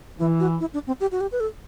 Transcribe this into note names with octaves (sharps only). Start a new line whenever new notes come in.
E3 E4
F#4
E4
D4
C4
G4
F#4
G4
B4
A4